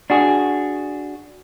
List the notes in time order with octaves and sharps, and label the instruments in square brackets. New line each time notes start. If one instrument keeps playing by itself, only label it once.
[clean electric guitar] D4 F#4 G#4